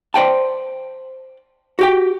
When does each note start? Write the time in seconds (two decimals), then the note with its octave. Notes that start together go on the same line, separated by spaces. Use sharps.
0.14 C5 D5 G5 A5
1.79 F#4 G4 G5